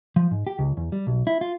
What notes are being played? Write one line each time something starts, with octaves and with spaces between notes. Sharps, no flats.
F3
G#2
G4
C#2
E2
G3
B1
E4
F4